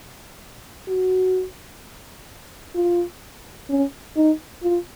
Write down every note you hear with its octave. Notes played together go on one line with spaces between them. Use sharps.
F#4
F4
C#4
D#4
F4